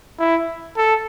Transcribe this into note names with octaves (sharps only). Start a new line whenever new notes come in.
E4
A4